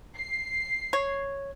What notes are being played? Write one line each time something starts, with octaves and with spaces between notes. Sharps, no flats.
C7
C#5